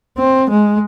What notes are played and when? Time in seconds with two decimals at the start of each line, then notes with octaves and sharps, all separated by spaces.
0.18 C4
0.50 G#3